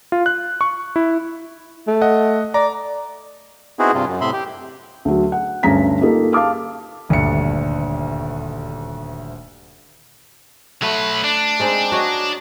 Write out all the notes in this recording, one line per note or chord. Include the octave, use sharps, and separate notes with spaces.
F4
F#6
C#6
E4
A3
D#5 F#5
D5 A#5
B3 C4 D#4 E4 F#4 G#4
G2 C3 F4
F#2
A2 C3 E5 B5 C6
G4
D2 F#3
F#5
D2 G2 C#4 A#5 B6
A#3 D#4 F4 G4 A4
F5 A5 D6 F6
D#1 D2 G2 D4 C#7
F#3 A3 B4
D4
G#3 C4 D#4
F#4 C#5 D#5